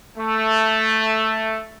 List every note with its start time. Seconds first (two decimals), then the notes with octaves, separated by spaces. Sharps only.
0.18 A3